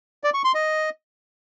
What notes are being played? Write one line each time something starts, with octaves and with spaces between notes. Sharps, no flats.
D5
C#6
C6
D#5